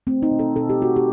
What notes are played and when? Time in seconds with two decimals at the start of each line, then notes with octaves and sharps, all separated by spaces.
0.07 A3 C4
0.22 D#4
0.31 B2
0.39 A4
0.56 B2 A4
0.69 G4
0.81 A3 F#4
0.96 G4